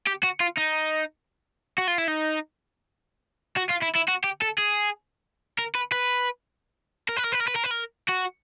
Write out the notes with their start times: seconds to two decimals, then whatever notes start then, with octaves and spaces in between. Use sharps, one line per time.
0.07 G4
0.23 F#4
0.40 F4
0.57 D#4
1.78 F#4
1.88 F4
1.98 E4
2.08 D#4
3.57 F#4
3.70 F4
3.83 E4
3.96 E4
4.08 F#4
4.24 G4
4.42 A4
4.58 G#4
5.59 A#4
5.75 B4
5.92 B4
7.09 A#4
7.16 B4
7.24 A#4
7.32 B4
7.40 A#4
7.47 B4
7.55 A#4
7.63 B4
7.71 A#4
8.09 F#4